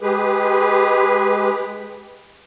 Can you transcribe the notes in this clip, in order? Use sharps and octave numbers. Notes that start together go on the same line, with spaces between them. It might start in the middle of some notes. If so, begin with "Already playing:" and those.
G#3 G4 G#4 B4